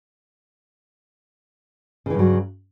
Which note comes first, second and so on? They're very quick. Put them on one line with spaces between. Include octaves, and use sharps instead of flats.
C#3 E3 G2 F#3